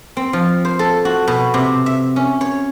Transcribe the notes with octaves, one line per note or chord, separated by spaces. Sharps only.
C4
F3
C5
A4
F#4
B2
C3
E5
C#4
C#5